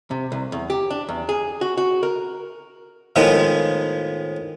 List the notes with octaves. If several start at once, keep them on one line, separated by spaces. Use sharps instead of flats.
C3
C2
E2
G4
D4
E2
G#4
F#4
F#4
A#4
A2 D#3 F3 G#3 B3